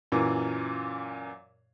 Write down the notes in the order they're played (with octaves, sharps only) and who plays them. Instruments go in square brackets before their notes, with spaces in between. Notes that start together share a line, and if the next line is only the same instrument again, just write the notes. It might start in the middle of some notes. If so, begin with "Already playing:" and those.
[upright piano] F#2 A#2 E3